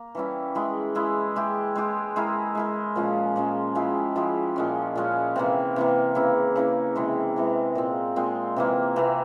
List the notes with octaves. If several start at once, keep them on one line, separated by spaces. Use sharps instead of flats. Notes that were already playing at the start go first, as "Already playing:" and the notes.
Already playing: A#3
E3 G3 C#4 E4
G#3 E4 G#4
G#3 E4 G#4
G#3 E4 G4
G#3 E4 G4
G#3 E4 A#4
G#3 E4 A#4
A#2 F3 G#3 C#4
A#2 F3 G#3 C#4
F3 G#3 E4 G4
F3 G#3 E4 G4
A#2 G#3 C#4
A#2 G#3 C#4
C3 E3 A#3
C3 E3 A#3
C#3 E3 A#3 E4
C#3 E3 A#3 E4
C3 E3 G#3
C3 E3 G#3
A#2 G#3 C4
A#2 G#3 C4
C3 E3 A#3
C3 E3 A#3